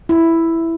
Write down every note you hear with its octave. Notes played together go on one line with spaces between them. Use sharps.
E4